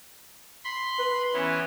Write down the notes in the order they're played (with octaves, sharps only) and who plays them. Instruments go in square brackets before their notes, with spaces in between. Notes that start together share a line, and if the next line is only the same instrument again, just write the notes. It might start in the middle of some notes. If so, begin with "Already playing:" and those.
[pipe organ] B5 C6
[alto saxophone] B4
[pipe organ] E3 B3 C#4